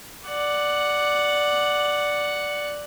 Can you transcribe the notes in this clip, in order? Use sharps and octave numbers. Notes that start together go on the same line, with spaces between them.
D5 F#5